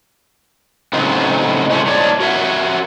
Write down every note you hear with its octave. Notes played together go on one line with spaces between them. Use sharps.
A2 C#3 F#3 B3 C4 D#4
E3 G#3 A3 B3 C#4 D#4
A#2 D#3 A3 D4 C#5 D5
F#4 A#4 C#5 E5 F#5